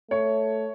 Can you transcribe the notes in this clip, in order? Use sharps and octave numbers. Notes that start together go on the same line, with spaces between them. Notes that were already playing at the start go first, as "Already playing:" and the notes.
A3 C#5